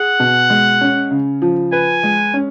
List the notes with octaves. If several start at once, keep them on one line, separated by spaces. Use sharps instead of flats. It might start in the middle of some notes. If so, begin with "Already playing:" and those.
Already playing: G#4 F#5
B2
G#3
C#4
C#3
F3
B4 G#5
G#3
C#4